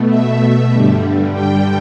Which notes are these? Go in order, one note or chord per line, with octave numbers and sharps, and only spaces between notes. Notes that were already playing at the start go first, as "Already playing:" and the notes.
Already playing: B2 A3
E5
G2 D3 G3
G5